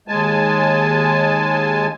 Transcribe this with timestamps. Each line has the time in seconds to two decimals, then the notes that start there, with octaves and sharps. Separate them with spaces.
0.08 D#2 G#3 G#5 A5